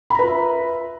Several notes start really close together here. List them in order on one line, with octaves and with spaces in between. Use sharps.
B5 A#5 B4 F4 E5